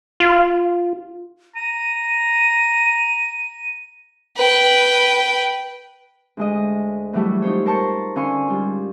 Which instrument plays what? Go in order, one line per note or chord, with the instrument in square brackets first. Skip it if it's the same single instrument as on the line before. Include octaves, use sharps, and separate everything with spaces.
[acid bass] F4
[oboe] A#5 [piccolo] D#7
[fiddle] B4 G5
[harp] D2 G#3 D#5
A2 E3 F#3 G3 A3
D#4 F4 C5 C#5
A#4 C5 A5 C#6
D3 C#4 F5 G#5 C6 C#6
G#2 G3 F4